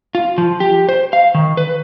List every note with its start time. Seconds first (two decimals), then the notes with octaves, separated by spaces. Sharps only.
0.15 F4
0.38 F3
0.60 G4
0.89 C5
1.13 F5
1.35 D#3
1.57 B4